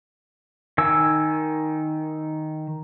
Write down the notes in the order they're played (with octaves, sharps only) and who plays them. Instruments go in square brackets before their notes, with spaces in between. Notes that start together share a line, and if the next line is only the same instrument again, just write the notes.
[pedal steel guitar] D#3 G#5 E6